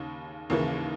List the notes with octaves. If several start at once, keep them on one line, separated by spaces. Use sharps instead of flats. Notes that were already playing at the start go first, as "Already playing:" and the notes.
Already playing: D#2 C#3
D#2 C#3 E3 A#3